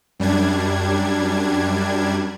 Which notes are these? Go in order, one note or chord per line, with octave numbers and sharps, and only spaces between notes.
F#2 G3 D4 G#6